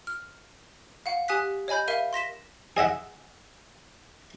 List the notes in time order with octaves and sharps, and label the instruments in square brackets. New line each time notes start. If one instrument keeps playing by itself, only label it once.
[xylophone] F6
F5 F#5
G4 G#5 D#6 F#6 B6
C#5 D#5 G#5 B5 G6
A#4 E5 F5 D#7
C6 A#6 B6 E7
[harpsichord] G#4 D#5 E5 F#5